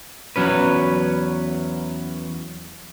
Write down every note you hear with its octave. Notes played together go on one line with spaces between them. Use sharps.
E2 F#3 C#4 B4